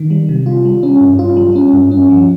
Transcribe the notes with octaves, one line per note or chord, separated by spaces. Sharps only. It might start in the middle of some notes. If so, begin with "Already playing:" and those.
Already playing: D#3
G3
C3
F4
G3
C#4
G2
F4
G3
C#4
G2
C#4
F3